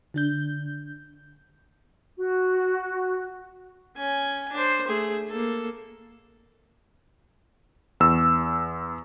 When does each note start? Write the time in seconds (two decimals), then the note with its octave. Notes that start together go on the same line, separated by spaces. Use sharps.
0.14 D3 D4 G6
2.16 F#4
3.97 C#4 G#5
4.52 D4 C5
4.87 A3 G#4
5.28 A#3 A4
8.00 E2 E6